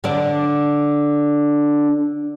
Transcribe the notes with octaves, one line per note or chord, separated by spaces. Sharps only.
D3 D4 D5